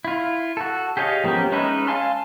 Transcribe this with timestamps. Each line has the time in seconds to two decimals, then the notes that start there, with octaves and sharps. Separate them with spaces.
0.05 E4 F4
0.57 F#4 A4
0.97 G4 G#4 C#5 D#5 F5
1.24 F3 A#3 B3 C#4 G4
1.52 G#3 C#4 D#4 B4 E5
1.87 F5 G#5 A5 C6 F6